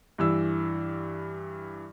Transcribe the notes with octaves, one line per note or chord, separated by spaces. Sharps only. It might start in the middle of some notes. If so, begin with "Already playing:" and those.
G2 E3 E6